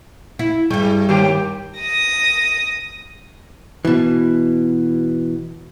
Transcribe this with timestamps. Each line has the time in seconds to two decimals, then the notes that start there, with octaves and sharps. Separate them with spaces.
0.39 E4
0.70 G2 G3 G#3
1.09 D#2 D#3 G4
1.80 D#6 A#6
3.85 B2 E3